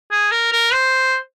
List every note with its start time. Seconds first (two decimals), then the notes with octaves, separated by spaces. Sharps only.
0.11 G#4
0.32 A#4
0.52 A#4
0.73 C5